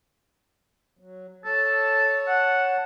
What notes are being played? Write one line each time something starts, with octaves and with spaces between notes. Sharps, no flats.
F#3
A4 C#5 A5
F#5